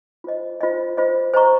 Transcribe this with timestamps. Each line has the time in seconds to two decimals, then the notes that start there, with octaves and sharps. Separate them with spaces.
0.24 F4 C5 D#5
0.61 F4 C5 D#5
0.97 F4 C5 D#5
1.34 C5 D#5 A#5 C#6